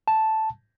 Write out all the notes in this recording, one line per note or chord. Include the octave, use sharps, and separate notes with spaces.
A5